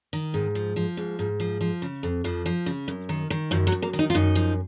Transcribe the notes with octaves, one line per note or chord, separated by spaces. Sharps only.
D#3
G#2
F3
F3
G#2
G#2
F3
F3
C#3
F2
F2 F3
F3
C#3
F#2
D#3
D#3
F#2 F3
F#3
F#2
A#3
D#3
D#4
F4
F#2 D#4
F3